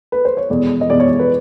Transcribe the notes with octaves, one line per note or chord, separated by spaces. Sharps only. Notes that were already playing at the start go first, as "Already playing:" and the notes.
B4
C5
C#5
E2 B2 G#3 D5
D#5
E2 B2 G#3 D5
C#5
B4